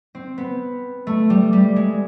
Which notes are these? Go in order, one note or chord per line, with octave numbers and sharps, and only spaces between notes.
C4
B3
A3
G3
G3
G#3